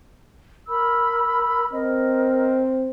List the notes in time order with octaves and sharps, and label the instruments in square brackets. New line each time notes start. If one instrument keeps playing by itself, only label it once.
[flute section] A#4 B5 E6
[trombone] C4 [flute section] A#4 D#5